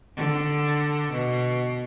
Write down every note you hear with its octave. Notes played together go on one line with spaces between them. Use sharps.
D3
B2